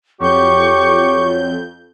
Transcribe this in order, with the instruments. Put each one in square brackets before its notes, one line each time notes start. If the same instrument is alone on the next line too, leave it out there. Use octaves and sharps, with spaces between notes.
[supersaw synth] F2 G6 [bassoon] F#3 [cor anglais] G4 [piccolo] C#6